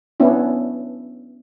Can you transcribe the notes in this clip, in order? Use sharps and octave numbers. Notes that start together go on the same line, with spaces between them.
B3 C#4 D4 E4